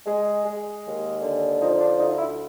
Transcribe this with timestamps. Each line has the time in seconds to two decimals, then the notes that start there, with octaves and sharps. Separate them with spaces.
0.06 G#3
0.45 G#3
0.84 D#2
1.22 D3
1.60 F3 D#4
1.80 D4
1.98 D2 D#4
2.17 E4